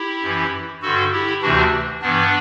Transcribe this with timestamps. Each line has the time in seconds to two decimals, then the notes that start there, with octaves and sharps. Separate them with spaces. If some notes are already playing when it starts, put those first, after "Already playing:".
Already playing: E4 G4
0.23 F#2 E3
0.82 G2 D3 F#4 A4
1.12 E4 G4
1.42 D2 C3 E3 D4 F#4
2.02 G2 E3 B3 D4